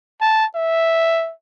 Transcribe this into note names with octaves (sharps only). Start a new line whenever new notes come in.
A5
E5